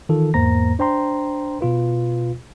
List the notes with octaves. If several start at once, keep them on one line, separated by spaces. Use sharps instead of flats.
D#3 E3 F4 A4
E2 G#2 A#3 C5 A#5 A#6
D4 C5 G5 A#5 C6
B2 F4 B4